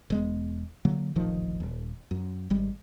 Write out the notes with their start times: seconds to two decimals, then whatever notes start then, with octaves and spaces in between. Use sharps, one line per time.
0.10 E1 G#3 B3
0.85 D3 F#3 A#3
1.16 D1 G#1 D#3 F3
1.60 D#1
2.11 F#2
2.50 G#1 G3 G#3